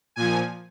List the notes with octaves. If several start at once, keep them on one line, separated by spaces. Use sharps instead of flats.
A#2 F3 G#5